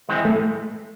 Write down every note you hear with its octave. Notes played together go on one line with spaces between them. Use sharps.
E3 G#3 C4
A2 A3